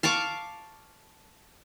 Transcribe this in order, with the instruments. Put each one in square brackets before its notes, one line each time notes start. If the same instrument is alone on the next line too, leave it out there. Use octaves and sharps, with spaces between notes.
[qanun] F5 A5 C#6 D6